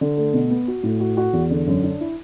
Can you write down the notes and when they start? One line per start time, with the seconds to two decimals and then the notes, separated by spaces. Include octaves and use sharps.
0.01 D3
0.17 A3
0.33 B2
0.50 B3
0.68 F#4
0.83 A2
1.00 F#4
1.17 F#4
1.33 E2
1.50 D3
1.67 F#2
1.84 D4
2.00 E4